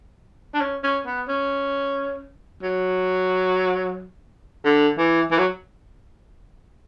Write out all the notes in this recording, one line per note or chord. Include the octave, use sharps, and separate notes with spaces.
D4
C#4
C#4
B3
C#4
F#3
D3
E3
E3
F#3